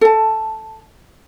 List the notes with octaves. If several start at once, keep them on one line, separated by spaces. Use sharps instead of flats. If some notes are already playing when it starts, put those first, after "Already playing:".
A4 A5